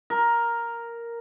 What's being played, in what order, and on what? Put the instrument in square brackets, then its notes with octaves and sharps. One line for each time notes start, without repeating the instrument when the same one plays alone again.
[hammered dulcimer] A#4